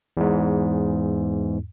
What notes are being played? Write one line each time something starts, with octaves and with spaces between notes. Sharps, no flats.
E2 G#2